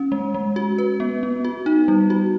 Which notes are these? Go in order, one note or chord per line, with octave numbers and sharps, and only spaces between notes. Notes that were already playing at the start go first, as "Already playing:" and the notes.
Already playing: C#4
G#3
G#3
F#4
B4
B3
B3
F#4
D#4
G3
F#4